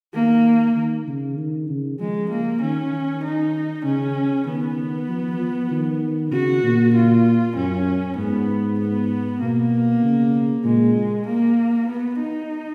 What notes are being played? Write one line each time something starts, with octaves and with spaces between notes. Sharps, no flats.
D#3 A#3
D#3
C#3
D#3
C#3
F3 G#3
A#3
D#3 C#4
D#3
D#4
C#3 C#4
D#3 B3
F3
F3
D#3
C#3 F#4
A#2
F4
F#2 C#4
G#2 B3
B3
B2 A#3
C#3
A#2 G#3
A#3
B3
D#4